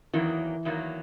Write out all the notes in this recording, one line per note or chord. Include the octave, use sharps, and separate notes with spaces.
E2 D#3 E3 F#3 A#3
E2 D#3 F#3 A#3